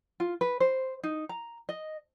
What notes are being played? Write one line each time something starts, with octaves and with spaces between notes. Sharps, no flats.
F4
B4
C5
D#4
A#5
D#5